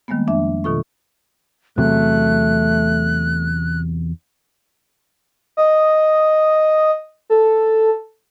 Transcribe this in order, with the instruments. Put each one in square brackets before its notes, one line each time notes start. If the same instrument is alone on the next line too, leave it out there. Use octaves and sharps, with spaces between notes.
[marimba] D#3 G3 G#3 A#3 B3
F2 F3 D4 E5
B2 D#3 F4 A4 C#6
[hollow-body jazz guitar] E2 C3 F#3 [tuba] A3 [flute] F#6
[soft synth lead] D#5
A4